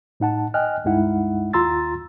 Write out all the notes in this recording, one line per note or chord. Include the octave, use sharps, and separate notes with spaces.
A2 D#4 F#5 A5
D#5 G5 G#5 F6 F#6
C#2 G2 G#3 D#4 E4 F#5
D#2 F4 A#5 C6 E6 A6